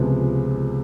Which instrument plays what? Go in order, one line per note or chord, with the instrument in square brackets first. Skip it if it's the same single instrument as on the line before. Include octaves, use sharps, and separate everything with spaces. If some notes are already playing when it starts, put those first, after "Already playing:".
Already playing: [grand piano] C#2 C3 F3 G#3 B3